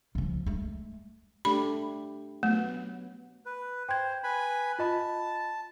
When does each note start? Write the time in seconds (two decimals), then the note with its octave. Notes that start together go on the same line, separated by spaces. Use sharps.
0.15 C#3 F3
0.46 G#3 A3
1.45 A3 D4 G4 B5
2.43 F#3 A3 B3
3.45 B4
3.89 C5 G5 G#6
4.24 B4 G#5 B5
4.79 F4 D#5 A5 B5